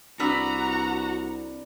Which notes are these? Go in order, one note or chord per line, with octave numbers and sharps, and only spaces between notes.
C2 D4 F#4 B4 A#5 E6